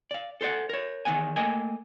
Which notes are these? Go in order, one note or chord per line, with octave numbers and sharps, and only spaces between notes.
D5 F5
A4 C5 D5 F#5
A#4 C#5
E2 D#3 A#3 B3 F#5 G#5
A3 A#3 A#4 D#5 G5 G#5